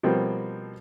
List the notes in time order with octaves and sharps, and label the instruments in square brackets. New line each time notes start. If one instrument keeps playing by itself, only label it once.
[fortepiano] B2 F3 G3 A#3 C4